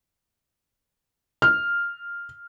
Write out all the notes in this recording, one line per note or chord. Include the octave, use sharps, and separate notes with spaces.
F6